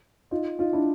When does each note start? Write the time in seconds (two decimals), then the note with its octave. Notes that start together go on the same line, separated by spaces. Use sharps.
0.31 D#4 F4
0.59 D#4 F4
0.73 D4 E4